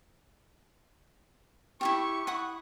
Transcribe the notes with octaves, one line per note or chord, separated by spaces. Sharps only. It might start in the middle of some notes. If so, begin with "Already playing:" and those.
E4 F4 G4 C#6
E4 F#5 D#6